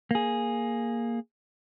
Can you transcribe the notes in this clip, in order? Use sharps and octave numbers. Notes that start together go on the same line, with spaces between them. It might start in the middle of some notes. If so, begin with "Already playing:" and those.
A#3 G#4